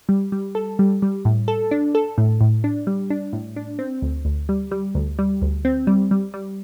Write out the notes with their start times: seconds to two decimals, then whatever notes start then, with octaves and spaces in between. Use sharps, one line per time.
0.09 G3
0.32 G3
0.55 A4
0.79 G3
1.02 G3
1.25 A2
1.48 A4
1.71 D4
1.95 A4
2.18 A2
2.41 A2
2.64 D4
2.87 G3
3.10 D4
3.33 A2
3.56 D4
3.79 C4
4.02 D2
4.25 D2
4.49 G3
4.71 G3
4.95 D2
5.19 G3
5.42 D2
5.65 C4
5.87 G3
6.11 G3
6.34 G3